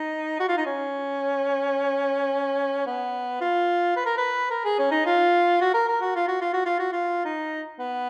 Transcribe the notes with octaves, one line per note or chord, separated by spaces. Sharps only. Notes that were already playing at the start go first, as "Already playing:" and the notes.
Already playing: D#4
F#4
F4
D#4
C#4
B3
F4
B4
A#4
B4
A#4
G#4
C#4
D#4
F4
F#4
A#4
A#4
F#4
F4
F#4
F4
F#4
F4
F#4
F4
D#4
B3